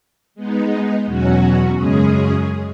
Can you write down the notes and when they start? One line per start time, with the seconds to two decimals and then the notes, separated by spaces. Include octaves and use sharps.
0.35 G#3 B3 D#4
1.05 E2 B2 F#3 C#4 F#4
1.75 F#2 C#3 G#3 C#4 G#4